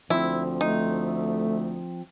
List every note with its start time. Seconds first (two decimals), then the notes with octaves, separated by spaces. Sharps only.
0.10 D2 F3 C4 E4
0.61 A3 D#4